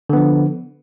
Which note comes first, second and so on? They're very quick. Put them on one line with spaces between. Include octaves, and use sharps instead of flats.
D3 B3 F3